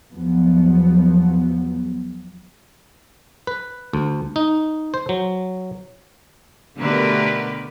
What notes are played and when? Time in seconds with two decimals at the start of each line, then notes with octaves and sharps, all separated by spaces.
0.13 E2 F3 F#3 B3
3.47 B4
3.93 D2
4.36 D#4
4.94 C5
5.09 F#3
6.79 B2 D3 A3 G4 A#4 B4